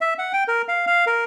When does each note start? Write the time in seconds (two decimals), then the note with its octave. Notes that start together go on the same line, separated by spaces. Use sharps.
0.01 E5
0.18 F#5
0.33 G5
0.48 A#4
0.68 F5
0.87 F5
1.07 A#4